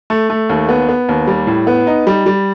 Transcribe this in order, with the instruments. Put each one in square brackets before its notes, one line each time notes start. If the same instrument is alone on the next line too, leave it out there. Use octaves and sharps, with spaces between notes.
[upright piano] A3
A3
D#2
B3
B3
D#2
G3
A2
B3
D#4
G3
G3